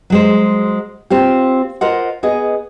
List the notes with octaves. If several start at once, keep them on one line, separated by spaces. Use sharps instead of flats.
F#3 G#3 C5
C4 F4 G4
F4 A#4 C5 D#5 F#5
B3 G#4 D#5